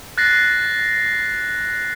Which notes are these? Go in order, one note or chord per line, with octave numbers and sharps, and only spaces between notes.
F#6 A6 A#6 C7